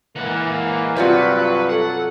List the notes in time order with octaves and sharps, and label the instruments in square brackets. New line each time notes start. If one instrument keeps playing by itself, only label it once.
[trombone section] E3 A#3 [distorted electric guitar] G#3 F#5
[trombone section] G2 F#3 [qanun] C3 F4 F#4 [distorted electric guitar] B4 [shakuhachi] D5
[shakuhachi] A4 [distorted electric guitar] F#5